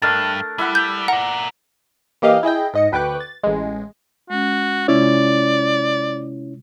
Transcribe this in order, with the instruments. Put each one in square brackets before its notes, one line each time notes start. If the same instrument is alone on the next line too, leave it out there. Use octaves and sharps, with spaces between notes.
[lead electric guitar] G2 [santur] A3 D4 A#4 [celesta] F6 A6
[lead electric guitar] G3 [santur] E4 E5 F#5
[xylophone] G6
[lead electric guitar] A#4 D5 [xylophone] F#5 [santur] A#5
[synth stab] E3 A#3 G4 D#5 F5
E4 G#4 D#5 G5
G#2 D#5 C#7
D2 B4 G5 C#6 D6 F#6
A6
A1 G#3
[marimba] G#3 C#4 [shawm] F#4
[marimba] C3 G#3 F4 [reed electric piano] C#4 E4 C#5 [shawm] D5